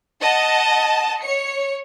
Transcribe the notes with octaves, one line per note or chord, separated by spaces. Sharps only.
D#5 F#5 A5
C#5 C#7